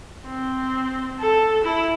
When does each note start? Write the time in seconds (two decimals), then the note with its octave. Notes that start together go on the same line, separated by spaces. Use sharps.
0.25 C4
1.19 A4
1.64 E4